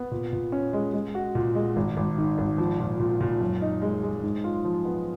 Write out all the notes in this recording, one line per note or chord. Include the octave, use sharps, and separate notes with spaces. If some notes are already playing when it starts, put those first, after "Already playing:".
Already playing: B3
A#2
A#2
C#4
G#3
G#3
F#4
A#2
G#3
G#1
G#1
D#3
G#1
F3
A#2
A#2
A#2
F#2
D#4
G#3
G#3
G#2
F4
F3
B3